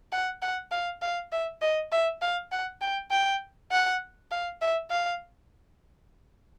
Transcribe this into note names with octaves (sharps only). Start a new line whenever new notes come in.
F#5
F#5
F5
F5
E5
D#5
E5
F5
F#5
G5
G5
F#5
F5
E5
F5